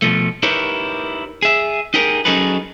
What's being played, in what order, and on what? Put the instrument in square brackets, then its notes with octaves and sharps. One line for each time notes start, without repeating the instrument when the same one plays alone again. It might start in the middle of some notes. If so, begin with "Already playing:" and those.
[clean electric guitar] B2 E3 F3 A3
D#4 E4 G4 A#4 B4 C#5
G#4 E5
D#4 G4 G#4 A#4
F#3 C#4 D#4 G#4 A4 B4